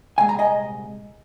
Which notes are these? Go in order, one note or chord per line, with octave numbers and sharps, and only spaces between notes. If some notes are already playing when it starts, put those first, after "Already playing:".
C2 A#2 G#3 G#5
A#5
D#5 G#5